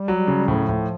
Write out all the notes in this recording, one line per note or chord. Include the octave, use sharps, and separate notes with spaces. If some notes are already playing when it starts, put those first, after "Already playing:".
Already playing: G3
F#3
C#3
A2 F3
F#3
A2 F3